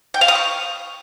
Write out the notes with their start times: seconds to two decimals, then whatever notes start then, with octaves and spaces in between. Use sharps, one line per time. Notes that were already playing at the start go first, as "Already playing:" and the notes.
0.14 G5
0.21 F5
0.28 D#6
0.35 C#6